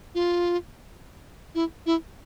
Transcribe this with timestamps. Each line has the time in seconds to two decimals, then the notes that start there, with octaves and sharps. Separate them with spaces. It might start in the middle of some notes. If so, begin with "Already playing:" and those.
0.15 F4
1.55 E4
1.86 E4